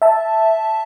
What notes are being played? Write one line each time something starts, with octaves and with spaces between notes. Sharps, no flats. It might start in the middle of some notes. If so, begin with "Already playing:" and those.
E5 A5